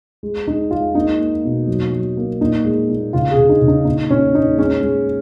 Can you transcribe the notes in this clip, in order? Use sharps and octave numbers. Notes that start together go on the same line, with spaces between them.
G#3
G#3 D#4
G#3 F4
A#3 D#4
A#3
B2
F#3
F#3
A#3
A#2 D#4
G#3
A#2
C#3 F4
G#4
C#3
D#4
C#3
D#4
A#2 D#4
A#2 C#4
A#2 D#4
G#3 C#4
G#3